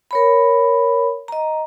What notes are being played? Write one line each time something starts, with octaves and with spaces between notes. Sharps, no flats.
A#4 C#5 B5
D#5 A#5